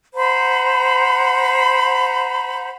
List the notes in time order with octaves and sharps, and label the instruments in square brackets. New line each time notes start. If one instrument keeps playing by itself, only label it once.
[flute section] C5 F#5 A#5 B5